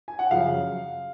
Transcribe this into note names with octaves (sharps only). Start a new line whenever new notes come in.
G#5
F#5
F#2 C#3 F3 F5